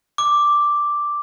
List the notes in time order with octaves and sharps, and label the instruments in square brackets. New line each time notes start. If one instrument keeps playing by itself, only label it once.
[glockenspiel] D6